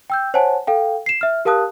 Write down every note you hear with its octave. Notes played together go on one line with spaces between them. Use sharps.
G5 E6 G6
C5 C#5 F#5 G#5 A5
A4 F5 G5
C7 E7
E5 F6
G4 A#4 F5 A5 D#6 F#6